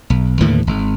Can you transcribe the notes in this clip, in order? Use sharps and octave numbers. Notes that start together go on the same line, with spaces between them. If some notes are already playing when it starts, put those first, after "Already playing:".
B1
D#2 A2 D3 E3
G#1